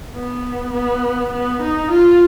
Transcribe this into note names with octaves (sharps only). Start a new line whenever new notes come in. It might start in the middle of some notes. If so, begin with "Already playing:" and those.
B3
B3
B3
D#4
F4